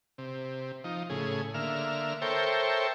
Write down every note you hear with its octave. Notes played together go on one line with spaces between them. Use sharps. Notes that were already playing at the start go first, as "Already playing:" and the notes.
C3
F3 D#4
A2 C#3 G#4
D3 A#3 E5 F6
A4 A#4 C5 C#5 E5 G5